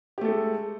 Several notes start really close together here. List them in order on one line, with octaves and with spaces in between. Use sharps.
G4 A3 A4 G#3